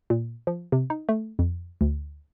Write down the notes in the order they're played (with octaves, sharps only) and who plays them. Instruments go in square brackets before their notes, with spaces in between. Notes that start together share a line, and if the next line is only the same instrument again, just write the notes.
[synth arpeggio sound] A#2
F3
C3
D#4
A3
F2
D2